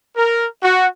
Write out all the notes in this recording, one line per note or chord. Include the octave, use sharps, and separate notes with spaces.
A#4
F#4